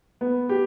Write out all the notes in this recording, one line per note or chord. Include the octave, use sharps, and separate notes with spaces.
B3
G4